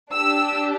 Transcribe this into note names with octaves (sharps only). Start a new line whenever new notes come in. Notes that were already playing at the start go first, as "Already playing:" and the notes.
D4 G4 E6